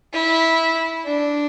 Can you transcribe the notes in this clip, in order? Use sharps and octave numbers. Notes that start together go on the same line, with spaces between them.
E4
D4